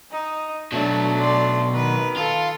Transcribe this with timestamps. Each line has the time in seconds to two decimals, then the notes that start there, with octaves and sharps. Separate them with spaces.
0.11 D#4
0.72 B2 F#3 A3 D4
1.17 D5 C6
1.73 D#3 B4
2.17 F4 A4